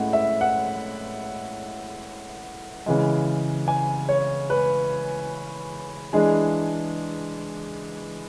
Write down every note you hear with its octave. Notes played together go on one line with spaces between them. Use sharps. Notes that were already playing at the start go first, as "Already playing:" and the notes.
Already playing: A2 G#3 C#4 E4 F#5
E5
F#5
C#3 E3 G#3
G#5
C#5
B4
E3 G#3 D4 G#4